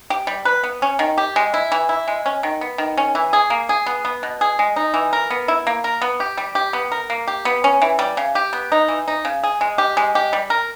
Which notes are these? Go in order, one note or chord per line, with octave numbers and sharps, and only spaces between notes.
G4
G3
B4
B3
C#4
D#3
G4
G#3
E4
E3
E4
G#3
C#4
D#3
B3
D#3
C#4
E3
G#4
A#3
G#4
B3
B3
B2
G#4
G#3
D#4
E3
A#4
B3
E4
A#3
A#4
B3
G4
G3
G4
B3
A#4
A#3
G4
B3
C#4
E3
G3
C#3
G4
B3
D#4
E3
D#4
C#3
G#4
G#3
G4
G#3
G4
G3
A#4